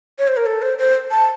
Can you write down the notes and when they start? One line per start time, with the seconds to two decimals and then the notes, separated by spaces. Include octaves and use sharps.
0.19 C#5
0.28 C5
0.37 A#4
0.46 A4
0.62 C5
0.78 C5
1.11 A5